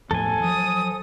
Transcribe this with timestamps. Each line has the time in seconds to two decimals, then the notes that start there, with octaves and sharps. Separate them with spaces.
0.11 E2 A2 F3 A4 G#5
0.44 F3 F#3 D#6